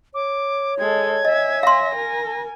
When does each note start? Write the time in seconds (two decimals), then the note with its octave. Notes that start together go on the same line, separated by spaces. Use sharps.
0.14 C#5 D6
0.79 G#3 A4 G#6
1.25 D#5 E5 G#5
1.63 F5 C6 A#6
1.96 A#4 G#5